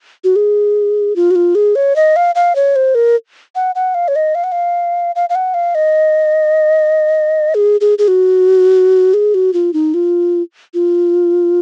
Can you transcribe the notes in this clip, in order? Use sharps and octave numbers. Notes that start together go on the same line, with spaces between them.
F#4
G#4
F4
F#4
F4
G#4
C#5
D#5
F5
F5
C#5
C5
A#4
F#5
F#5
F5
C#5
D#5
F5
F#5
F5
F5
F5
F#5
F5
D#5
G#4
G#4
G#4
F#4
G#4
F#4
F4
D#4
F4
F4